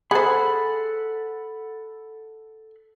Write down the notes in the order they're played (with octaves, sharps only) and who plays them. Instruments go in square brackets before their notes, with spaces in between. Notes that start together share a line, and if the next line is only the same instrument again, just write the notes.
[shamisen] G#4 C5 [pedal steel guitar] A4 F#5 B5